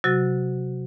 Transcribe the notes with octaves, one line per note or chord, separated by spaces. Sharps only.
C3 F#3 F#4 A6